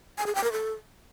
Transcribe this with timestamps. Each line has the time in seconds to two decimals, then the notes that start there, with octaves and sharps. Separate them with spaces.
0.18 G#5
0.26 G#4
0.35 G5
0.44 A#4
0.52 A4